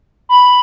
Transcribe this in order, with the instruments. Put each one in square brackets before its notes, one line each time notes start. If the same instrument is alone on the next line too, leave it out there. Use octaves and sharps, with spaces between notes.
[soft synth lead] B5